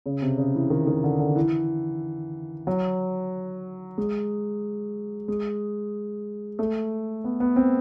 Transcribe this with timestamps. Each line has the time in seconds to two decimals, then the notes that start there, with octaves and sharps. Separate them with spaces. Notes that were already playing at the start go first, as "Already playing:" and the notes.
0.06 C#3
0.22 C3
0.38 C#3
0.55 E3
0.70 D#3
0.87 D#3
1.04 D3
1.19 D3
1.36 E3
2.67 F#3
3.98 G#3
5.28 G#3
6.59 A3
7.24 B3
7.40 B3
7.56 C4